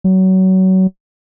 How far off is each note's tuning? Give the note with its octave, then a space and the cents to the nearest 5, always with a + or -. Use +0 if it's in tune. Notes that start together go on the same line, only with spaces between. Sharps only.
F#3 +25